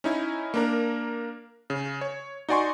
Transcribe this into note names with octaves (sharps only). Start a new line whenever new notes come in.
C#4 D#4 E4
A#3 D4 A#4
C#3
C#5
D#4 F#4 D5 G#5 C6 C#6